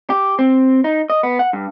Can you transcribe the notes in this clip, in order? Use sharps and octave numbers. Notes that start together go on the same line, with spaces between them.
G4
C4
D#4
D#5
B3
F#5
G2